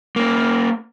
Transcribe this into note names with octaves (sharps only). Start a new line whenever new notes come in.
A#3 C#4